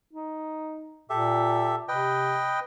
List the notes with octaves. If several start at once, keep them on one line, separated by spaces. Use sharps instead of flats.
D#4
A#2 G4 A4 E5
C3 B4 D#5 G5